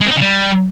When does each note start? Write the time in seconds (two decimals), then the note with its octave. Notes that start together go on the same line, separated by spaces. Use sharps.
0.01 G#3
0.06 C4
0.11 D#4
0.16 C#3
0.21 G3